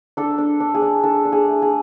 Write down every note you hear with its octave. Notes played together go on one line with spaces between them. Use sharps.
D4 A4
D4
D4
G#4
D4
D4 A4
D4
G#4
A3
G#4